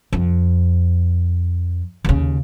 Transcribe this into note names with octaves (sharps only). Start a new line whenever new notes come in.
F2
D#2 C#3